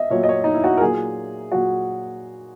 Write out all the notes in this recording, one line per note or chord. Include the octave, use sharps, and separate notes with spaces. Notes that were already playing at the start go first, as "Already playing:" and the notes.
Already playing: D#5 E5
A#2 F#3 C#5
D#5
C#5
D#4
E4
F#4
A#4
A#2 F#3 G#4
A#2 F#3 F#4